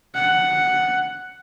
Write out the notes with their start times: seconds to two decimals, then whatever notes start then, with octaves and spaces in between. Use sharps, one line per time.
0.15 F#5